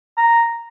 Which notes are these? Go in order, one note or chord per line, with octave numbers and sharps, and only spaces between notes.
A#5